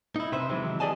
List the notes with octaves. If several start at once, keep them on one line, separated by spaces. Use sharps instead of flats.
D#4 E4
C3 B4 C5 E5
D#3 E3 F#3 G#3 C4
G4 G#4 D5 D#5 G#5 A5